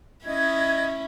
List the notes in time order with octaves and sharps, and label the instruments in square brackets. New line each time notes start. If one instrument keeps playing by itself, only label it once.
[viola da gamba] C#4 E4 [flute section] D#5 G#6